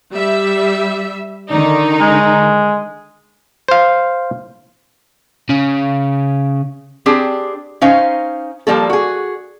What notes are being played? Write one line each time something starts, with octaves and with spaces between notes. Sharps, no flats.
G3 E5
D3 D#3 D#4 D5
G#3
C5 F5
C#3
C4 D4 G4 G#4
C#4 D#4 C5 F5
F3 G3 A#3 A4
F#4 G#4